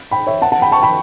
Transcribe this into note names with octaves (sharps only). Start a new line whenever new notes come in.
G5 B5
C#5 E5
F#5 A5
F#5 A5
G5 B5
A5 C#6
G5 B5